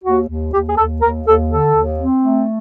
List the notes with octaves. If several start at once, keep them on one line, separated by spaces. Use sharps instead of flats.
D#2 F#4
D#2
D#2 G4
G#4
D#2 A4
D#2 A#4
D#2 A4
D3 A4
D#2
C4
A3